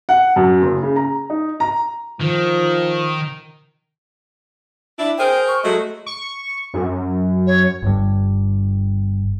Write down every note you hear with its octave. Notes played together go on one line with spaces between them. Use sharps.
F#5
F#2
F#1
C#3
A#5
D#4
A#5
D#3 F3
D4 E4
G#4 A#4 C5 G5
C#6
F#3 G#3 A3 D#5
C#6
F#2
C#5
G1 G2